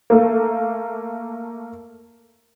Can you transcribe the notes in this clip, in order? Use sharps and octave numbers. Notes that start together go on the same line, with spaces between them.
A3 A#3